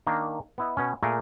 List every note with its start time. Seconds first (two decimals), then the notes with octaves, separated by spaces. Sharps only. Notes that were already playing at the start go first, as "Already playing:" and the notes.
0.07 D#3 A#3 D4
0.58 B3 E4 D#5
0.77 B2 C#4
1.03 A#2 A3 G#4 A#4